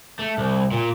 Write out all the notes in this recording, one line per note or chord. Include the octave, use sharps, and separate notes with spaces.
A3
C2
A#2